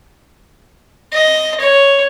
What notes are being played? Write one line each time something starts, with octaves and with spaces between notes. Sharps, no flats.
D#5
C#5